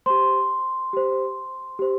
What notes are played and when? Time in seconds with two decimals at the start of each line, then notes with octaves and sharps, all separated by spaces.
0.06 G4 C5 C6
0.93 G4 C5
1.79 G4 C5